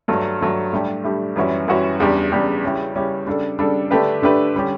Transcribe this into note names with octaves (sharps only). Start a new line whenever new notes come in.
G2 F#3 A3
G2 F#3 A3
A2 G3 D4 G4
A2 G3 D4 G4
F#2 E3 G3 C#4 F#4
F#2 E3 G3 C#4 F#4
E2 C#3 G3 D4 G4
E2 C#3 G3 D4 G4
C#3 G3 C#4 E4 G4
C#3 G3 C#4 E4 G4
C#3 G3 D4 A4
C#3 G3 D4 A4
D3 A3 D4 G4 B4
D3 A3 D4 G4 B4
D3 G3 C#4 G4